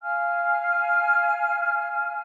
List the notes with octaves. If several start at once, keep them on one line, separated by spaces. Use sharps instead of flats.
F5 G#5 F6